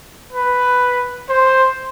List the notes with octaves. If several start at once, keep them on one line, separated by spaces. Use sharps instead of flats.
B4
C5